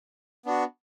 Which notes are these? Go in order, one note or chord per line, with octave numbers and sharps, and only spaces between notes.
B3 D4 F#4